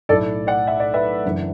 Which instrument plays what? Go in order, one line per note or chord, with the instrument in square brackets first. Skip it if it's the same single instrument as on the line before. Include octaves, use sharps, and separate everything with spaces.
[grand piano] B1 A2 A3 E4 A4 D5
D5 F#5
E5
D5
B4 E5
F#1 F#2 E3 D4